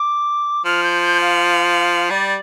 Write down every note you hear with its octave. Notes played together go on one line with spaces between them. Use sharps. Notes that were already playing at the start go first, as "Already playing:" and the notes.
Already playing: D6
F3 F6
G6
G6
F5
G3 D5